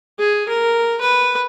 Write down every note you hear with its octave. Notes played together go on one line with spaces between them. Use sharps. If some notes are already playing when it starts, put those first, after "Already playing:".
G#4
A#4
B4